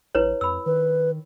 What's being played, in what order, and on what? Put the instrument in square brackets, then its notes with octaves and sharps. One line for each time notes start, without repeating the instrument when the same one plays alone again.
[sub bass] A#1 [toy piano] E4 B4 C#5
[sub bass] F2 [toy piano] B5 E6
[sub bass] D#3 [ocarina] B4